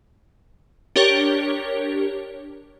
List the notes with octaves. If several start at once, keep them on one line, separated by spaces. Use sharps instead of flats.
D4 G4 A#4 C#5